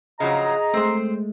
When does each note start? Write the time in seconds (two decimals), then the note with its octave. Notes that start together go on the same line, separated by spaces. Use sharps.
0.20 C#3 F3 F#3 G#4 D#5 A#5
0.74 G#3 A3 C4 C5